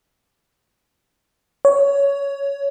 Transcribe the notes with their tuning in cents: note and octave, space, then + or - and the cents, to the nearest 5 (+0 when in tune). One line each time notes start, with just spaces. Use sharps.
C#5 +15